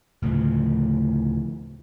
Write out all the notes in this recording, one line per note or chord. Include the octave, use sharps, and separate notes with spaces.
D2 A2 C#3 F3